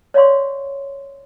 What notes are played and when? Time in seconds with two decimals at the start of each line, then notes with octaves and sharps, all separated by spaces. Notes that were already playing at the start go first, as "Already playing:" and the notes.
0.14 C#5 D5 F5 C6 C#6